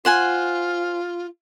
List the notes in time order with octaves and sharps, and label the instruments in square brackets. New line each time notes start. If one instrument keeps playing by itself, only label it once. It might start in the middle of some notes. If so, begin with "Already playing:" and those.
[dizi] F4 [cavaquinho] C5 F#5 G#5